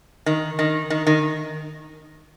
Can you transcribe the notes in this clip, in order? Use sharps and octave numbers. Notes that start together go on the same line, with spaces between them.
D#3
D#3
D#3
D#3